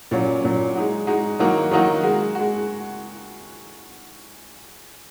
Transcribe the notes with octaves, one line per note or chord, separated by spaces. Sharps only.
A#2 F#3 C#4
A#2 F#3 C#4
G#3 D#4 F#4
G#3 D#4 F#4
D#3 F#3 A#3 D#4 F#4
D#3 F#3 A#3 D#4 F#4
G#3 F#4
G#3 F#4